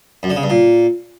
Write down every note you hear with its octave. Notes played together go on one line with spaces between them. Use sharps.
F#2
D3
C#3
G2
A#2